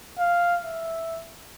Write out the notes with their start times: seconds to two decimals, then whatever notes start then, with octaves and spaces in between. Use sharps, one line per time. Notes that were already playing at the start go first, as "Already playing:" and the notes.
0.19 F5
0.63 E5